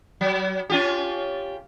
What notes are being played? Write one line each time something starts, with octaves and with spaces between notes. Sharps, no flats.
F#3
C#4 F4 G4